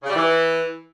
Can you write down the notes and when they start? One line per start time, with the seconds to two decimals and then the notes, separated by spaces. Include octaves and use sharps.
0.03 C#3
0.10 G3
0.16 E3